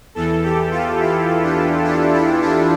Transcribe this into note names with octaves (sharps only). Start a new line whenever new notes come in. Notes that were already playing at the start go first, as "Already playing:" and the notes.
E2 E3 A4
G4
F4
E4
D4
D4
E4
D4